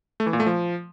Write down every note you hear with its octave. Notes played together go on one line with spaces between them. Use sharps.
A3
E3
A#2
A3
F3